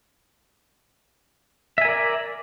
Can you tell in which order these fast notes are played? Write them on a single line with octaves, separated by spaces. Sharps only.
E5 G#5 A#4 D5